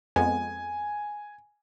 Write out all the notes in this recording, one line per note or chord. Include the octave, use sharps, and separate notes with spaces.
F2 G#3 B3 G#5